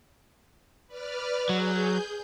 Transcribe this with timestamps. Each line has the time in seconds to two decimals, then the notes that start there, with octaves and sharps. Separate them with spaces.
0.87 B4 D5 F6
1.49 F#3 G#4 G6